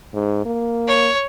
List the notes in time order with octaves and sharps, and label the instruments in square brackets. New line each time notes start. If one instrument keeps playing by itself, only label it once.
[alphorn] G#2
A#3
[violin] C#5